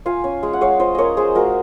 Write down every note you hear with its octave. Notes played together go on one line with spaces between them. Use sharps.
F4 F5 G#5
C#4
G#3
F#5
G#3 C#5 F5
F4 C5 D#5
C#4 A#4 C#5 D#5
G#3 G#4 C5
G#3 F#4 A#4